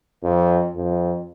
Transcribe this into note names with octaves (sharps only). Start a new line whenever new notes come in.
F2
F2